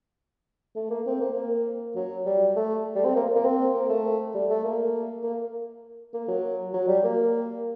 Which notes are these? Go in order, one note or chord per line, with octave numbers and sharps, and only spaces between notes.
A3
A#3
C4
A#3
A#3
F#3
G3
A3
G3
C4
A#3
A#3
C4
A#3
A3
G3
A3
A#3
A#3
A#3
F#3
F#3
G3
A#3